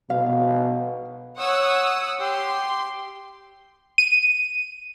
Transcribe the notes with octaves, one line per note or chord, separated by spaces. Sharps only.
B2 F5
C#5 F#5 D#6 E6
G4 C6
D#7